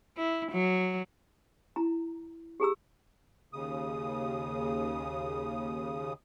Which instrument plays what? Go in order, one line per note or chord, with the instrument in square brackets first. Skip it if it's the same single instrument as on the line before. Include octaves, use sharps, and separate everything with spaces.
[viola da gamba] E4
F#3
[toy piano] E4 A#5
G4 G#4 A#5 E6
[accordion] D#2 C#3 D#6